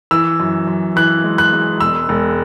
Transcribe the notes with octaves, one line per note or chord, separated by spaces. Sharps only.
E3 E6
F#2
F#2
E3 F#6
G#3
F#6
G#3
E1 E6
E1